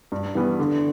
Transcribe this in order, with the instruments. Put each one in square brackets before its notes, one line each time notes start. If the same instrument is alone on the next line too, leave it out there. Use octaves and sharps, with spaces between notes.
[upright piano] G2
E3 G3 B3
D3